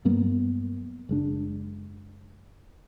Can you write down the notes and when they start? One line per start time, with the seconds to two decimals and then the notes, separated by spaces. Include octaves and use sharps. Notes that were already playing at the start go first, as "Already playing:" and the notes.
0.05 G2 F#3 A#3 B3
1.09 F#1 G#3 D4